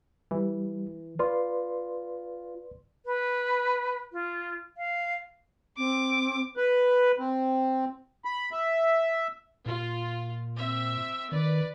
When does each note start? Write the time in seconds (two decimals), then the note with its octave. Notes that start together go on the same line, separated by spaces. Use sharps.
0.31 E3 G3
1.19 F4 B4 D5 C6
3.06 B4
4.13 F4
4.77 F5
5.78 C4 D6
6.57 B4
7.19 C4
8.25 B5
8.52 E5
9.66 A#2 F4
10.56 C4 E5
11.32 D#3 B4 D5